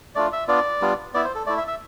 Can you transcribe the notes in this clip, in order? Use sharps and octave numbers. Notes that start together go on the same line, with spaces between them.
A3 D4 F4 D5
E5
B3 D4 F4 D5
G3 B3 D4 F4
B3 E4 D5
C5
A4
A3 E4 D5
E5
E5